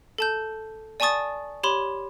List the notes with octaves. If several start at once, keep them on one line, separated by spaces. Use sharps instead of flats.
A4 A5 G6
D5 G#5 A5 C#6 D#6 A6
G4 C#5 B5 C6